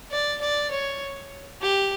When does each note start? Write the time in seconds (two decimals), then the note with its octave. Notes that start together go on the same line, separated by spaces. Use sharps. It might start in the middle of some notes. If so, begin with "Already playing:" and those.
0.11 D5
0.41 D5
0.71 C#5
1.62 G4